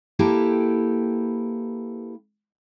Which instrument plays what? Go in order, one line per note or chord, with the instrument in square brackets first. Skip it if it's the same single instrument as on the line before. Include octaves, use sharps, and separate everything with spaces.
[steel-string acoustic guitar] A#3 E4 G4 A4 B4 G5